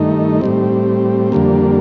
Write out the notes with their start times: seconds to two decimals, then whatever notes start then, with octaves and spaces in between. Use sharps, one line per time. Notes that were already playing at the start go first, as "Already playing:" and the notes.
Already playing: G2 D#3 A3 D#4
0.41 A2 G3 C4
1.32 F2 D3 G3 A#3